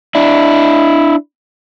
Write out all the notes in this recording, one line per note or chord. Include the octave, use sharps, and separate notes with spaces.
D4 E4